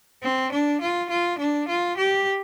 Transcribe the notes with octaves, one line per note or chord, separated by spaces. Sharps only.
C4
D4
F4
F4
D4
F4
G4